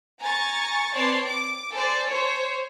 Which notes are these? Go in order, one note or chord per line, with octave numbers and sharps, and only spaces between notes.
G#5 A#5 C#6 A6
C4 B4 C#5 D5 A5 C6
D6 D7
A4 C5 D5 G#5
C5 C#5